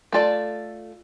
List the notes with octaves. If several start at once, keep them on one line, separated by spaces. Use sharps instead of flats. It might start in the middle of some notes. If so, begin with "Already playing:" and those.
A3 F4 A4 D5